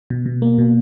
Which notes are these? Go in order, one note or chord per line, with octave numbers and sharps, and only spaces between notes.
B2
B2
A#3
B2